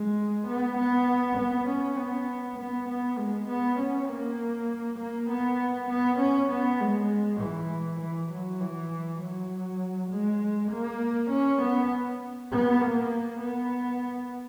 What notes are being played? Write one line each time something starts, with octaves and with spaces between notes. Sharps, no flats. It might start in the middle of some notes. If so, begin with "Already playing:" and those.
Already playing: G#3
B3
B3
B3
C#4
B3
B3
B3
G#3
B3
C#4
A#3
A#3
B3
B3
C#4
B3
G#3
E3
E3
F#3
E3
F#3
G#3
A#3
C#4
B3
B3
A#3
B3